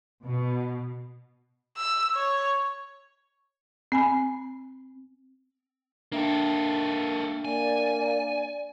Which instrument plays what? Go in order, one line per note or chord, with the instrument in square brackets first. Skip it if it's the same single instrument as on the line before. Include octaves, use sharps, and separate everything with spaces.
[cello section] B2
[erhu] E6
C#5
[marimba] C4 G#5 B5
[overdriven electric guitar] A#3 A4 [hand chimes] D4 E5 G5
[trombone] A#3 [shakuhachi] D5 [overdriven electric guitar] G#5